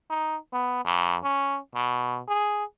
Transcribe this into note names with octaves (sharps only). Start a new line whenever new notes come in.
D#4
B3
F2
C#4
B2
G#4